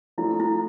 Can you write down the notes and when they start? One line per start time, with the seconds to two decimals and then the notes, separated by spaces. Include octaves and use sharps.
0.18 F3 A3 D4 E4 A4
0.40 E4